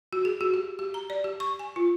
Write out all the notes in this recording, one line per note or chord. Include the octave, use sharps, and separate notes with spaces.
F#4
G#4
F#4
G4
G4
A#5
D5
G4
C#6
G#5
F4